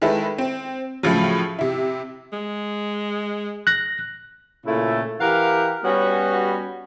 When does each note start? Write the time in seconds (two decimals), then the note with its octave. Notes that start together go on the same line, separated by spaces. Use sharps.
0.02 D#3 G#3 E4 A4 B4
0.38 C4
1.03 A2 C#3 F3 F#3
1.59 C3 E4
2.32 G#3
3.67 F#6 A#6
4.66 A#2 C#3 A3 E4
5.21 E3 G4 A#4 F5 F#5
5.84 G3 B3 C#4 F#4